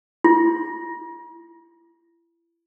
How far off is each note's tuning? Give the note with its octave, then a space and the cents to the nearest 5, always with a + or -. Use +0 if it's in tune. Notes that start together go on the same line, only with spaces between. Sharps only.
E4 +35